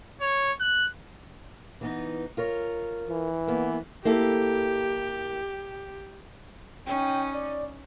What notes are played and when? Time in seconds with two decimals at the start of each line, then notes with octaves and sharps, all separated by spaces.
0.21 C#5
0.60 F#6
1.81 E3 B3 D#4
2.37 F4 A#4 C#5
3.09 E3
3.47 A#3 B3
4.05 A#3 E4 G4 A4
6.87 C#4 D#4 G5
7.33 D5